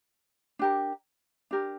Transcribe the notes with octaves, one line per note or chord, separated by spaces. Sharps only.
D4 G4 A#4
D4 G4 A#4